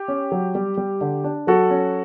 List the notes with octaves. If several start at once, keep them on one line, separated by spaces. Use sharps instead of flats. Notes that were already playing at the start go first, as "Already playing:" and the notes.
Already playing: G4
C#4
F#3
G3
G3
D3
D4
F#3 F#4 A4
C#4